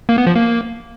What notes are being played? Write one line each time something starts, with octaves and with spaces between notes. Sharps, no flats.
A#3
B3
F3
A#3